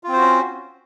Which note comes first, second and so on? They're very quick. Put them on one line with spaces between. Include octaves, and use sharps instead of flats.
F4 C4 C5 F#4 C#4